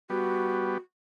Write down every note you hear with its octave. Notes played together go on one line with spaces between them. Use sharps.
G3 B3 F#4